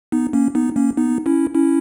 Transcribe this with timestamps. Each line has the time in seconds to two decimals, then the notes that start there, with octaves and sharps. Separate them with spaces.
0.12 B3 D#4
0.33 A#3 C#4
0.55 B3 D#4
0.76 A#3 C#4
0.97 B3 D#4
1.26 C#4 E4
1.55 C#4 E4